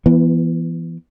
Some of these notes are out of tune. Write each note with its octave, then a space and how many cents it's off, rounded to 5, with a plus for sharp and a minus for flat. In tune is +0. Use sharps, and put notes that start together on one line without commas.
E3 +25 B3 -15